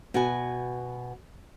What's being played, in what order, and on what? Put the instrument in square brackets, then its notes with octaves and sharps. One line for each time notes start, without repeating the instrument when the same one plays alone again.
[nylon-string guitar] B2 F#4 B4 G#5